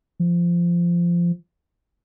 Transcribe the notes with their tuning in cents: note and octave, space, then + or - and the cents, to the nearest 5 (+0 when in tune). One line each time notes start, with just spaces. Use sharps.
F3 -15